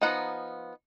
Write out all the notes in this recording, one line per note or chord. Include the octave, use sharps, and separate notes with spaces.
F3 B3 D#4 F#5 A#5